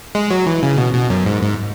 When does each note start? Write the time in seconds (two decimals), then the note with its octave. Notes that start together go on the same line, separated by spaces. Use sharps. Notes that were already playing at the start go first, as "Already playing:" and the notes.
0.15 G#3
0.30 F#3
0.47 E3
0.63 C#3
0.78 B2
0.93 B2
1.10 F#2
1.26 G#2
1.42 G#2